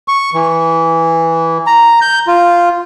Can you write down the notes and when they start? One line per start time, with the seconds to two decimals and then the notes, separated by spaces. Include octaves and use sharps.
0.08 C#6
0.34 E3
1.67 A#5
2.02 G6
2.27 F4